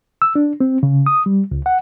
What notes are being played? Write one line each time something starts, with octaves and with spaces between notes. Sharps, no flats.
E6
D4
C4
C#3
D#6
G3
C#2
F#5